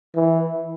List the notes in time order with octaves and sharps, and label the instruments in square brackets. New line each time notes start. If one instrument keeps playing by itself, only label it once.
[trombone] E3